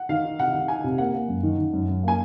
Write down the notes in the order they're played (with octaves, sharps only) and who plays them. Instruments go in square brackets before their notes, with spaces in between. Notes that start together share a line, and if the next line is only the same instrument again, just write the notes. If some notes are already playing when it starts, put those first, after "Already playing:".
Already playing: [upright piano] F#5
[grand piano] D#3 [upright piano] F5
[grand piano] D#4
[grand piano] C3 [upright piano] F#5
[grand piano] D#3
[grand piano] D#4 [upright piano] G#5
[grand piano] C3
[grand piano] A#3 [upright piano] F#5
[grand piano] A#3
F#2
D#3
D#3
F#2
F#2
[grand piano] A#3 [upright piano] G#5